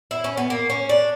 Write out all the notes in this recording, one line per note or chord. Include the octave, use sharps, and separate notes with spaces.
E4
C#4
B3
A#3
C#4
D4